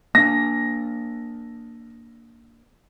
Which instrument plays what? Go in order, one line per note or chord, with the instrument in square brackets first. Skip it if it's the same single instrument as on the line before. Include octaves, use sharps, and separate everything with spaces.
[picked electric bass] A#3 D4 [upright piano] A#6